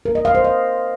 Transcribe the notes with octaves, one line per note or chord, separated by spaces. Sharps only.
A#4
D#5
F5
C5
D#5